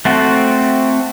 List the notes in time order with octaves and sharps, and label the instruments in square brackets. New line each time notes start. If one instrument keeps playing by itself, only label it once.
[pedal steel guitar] A3 C4 F#4